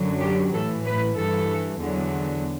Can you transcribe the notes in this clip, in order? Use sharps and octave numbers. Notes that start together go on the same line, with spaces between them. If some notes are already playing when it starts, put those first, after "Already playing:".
Already playing: F#2 D3 F#3
G4
A2 E3 A4
B4
G2 E3 A4
E2 D3 F#3